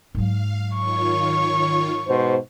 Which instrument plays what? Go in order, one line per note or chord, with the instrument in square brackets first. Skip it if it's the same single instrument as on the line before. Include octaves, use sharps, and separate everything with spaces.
[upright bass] G#2 F#3 [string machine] F5
[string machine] D#3 F4 C#5 [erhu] C#6
[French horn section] G#2 B2 C5